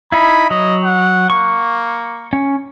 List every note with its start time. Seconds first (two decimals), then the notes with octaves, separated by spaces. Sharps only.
0.12 D#4 E4 B5
0.51 F#3 D#5
0.84 F#5
1.30 A#3 C#6
2.33 C#4